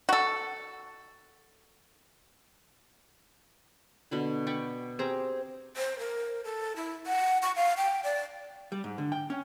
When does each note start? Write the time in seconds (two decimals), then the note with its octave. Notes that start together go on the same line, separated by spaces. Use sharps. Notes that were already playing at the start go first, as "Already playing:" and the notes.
0.09 F#4 A4
4.11 B2 D3 B5
4.47 D5 G5 B5 C#6
4.99 C4 G4 G#4 A#5
5.77 C5
5.99 A#4
6.44 A4
6.76 E4
7.07 F#5
7.42 C#6
7.56 F5
7.77 G5
8.04 D5
8.72 G3
8.84 G#2
8.98 D3
9.12 G5
9.30 C#4